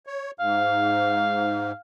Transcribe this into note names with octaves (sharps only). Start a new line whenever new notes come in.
C#5
G#2 F5